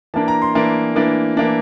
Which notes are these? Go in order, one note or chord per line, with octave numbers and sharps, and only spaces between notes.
E3 A#3 D4 A5
A#5
C6
E3 A#3 D4
E3 A#3 D4
E3 A#3 D4